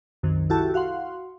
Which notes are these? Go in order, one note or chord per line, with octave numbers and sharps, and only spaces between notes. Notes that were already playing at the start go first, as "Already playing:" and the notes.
C2 F#2 C3 D#3
E4 F#4 G4 A4 A5
F#4 F5 F#5 C6